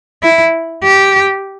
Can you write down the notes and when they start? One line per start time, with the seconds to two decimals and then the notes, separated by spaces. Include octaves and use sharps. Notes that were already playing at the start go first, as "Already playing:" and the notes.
0.23 E4
0.83 G4